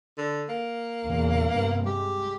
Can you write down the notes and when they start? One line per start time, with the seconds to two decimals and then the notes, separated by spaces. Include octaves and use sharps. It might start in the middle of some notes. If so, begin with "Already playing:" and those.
0.18 D3
0.49 A#3
1.04 E2 A#2 C#3
1.51 G2 C3 B3
1.86 G#3 G4